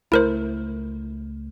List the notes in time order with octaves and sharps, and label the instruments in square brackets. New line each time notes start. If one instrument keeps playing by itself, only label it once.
[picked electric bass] C#2 A3 [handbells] E4 A#4 C5